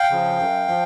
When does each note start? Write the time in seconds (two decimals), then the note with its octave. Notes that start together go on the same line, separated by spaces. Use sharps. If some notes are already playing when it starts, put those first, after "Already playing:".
Already playing: F5 G5
0.11 C#3 F3
0.39 F#2
0.68 F3